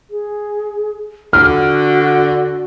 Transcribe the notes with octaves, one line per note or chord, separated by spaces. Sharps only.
G#4
D3 F#4 F6